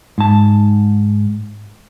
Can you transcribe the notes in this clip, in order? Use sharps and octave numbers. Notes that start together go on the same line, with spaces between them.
G#2 A5